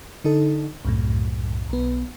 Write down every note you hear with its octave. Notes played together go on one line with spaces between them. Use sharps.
D3 D#4 A4
C2 F#2 A2
B1 B3